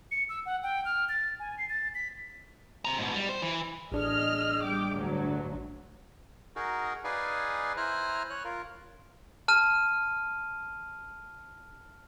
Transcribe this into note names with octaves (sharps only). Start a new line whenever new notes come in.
C#7
E6
F#5
G5
F6
A6
G#5
C7
A6
B6
C4 A#5
G#2 B2
G3
C5
E3
A1 D4 G#4 D#5 F6
G3 G5 D6
D2 G2 F#3
D#4 F#4 G#4 A#4
D#4 G#4 B4 D5 F5 G#5
E4 C5 G#5 A#5 F6 F#6
C#5 F#6
F4 A#4
A5 F6 D#7